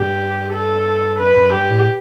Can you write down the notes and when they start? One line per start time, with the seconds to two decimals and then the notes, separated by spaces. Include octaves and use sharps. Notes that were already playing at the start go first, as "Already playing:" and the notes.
Already playing: G2 G4
0.53 A4
1.19 F#2 B4
1.36 F#2
1.53 G2 G4
1.70 A2